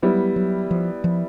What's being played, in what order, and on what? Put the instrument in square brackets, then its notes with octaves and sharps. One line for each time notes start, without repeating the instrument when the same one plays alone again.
[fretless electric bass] F#3 [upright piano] G3 B3 E4
[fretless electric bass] F#3
F3
F3